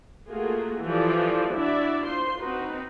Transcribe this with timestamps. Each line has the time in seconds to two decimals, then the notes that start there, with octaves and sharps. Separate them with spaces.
0.30 A3 A#3 F4 F#4 G#4
0.83 E3 F3 G3 A4 D5
1.54 D4 E4 F#4 D5 E5
2.06 F4 C5 C6
2.38 C4 D#4 F#4 B4